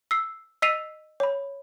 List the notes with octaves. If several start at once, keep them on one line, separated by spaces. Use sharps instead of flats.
E6 C7
D#5 E6 B6 C7 D#7 F7
C#5 B5